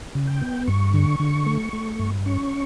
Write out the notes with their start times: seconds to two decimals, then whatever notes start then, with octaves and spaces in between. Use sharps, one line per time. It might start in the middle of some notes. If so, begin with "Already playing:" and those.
0.15 C#3
0.27 G5
0.41 B3
0.67 G2 C#6
0.94 D3
1.20 D3
1.46 A3
1.73 A3
1.99 G2
2.26 C#4 C#6